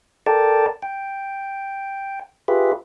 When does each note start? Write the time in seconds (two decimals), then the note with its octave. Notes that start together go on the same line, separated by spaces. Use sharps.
0.26 A4 A#4 D5 G5 A5
0.82 G5
2.48 F4 G4 G#4 B4 E5